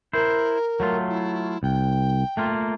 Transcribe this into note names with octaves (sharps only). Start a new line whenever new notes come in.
E4 A#4 C5
F#3 A3 F4
E4
C2 G5
A3 A#3 F4